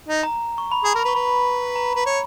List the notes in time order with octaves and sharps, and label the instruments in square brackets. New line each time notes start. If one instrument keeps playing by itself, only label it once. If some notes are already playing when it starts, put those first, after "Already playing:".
[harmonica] D#4
[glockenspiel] A#5
C#6
B5
[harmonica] G#4 [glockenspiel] A#5
[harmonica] A#4
[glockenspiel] B5
[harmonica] B4
[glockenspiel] C#6
[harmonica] B4 [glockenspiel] B5
[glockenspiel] A#5
[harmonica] B4
C#5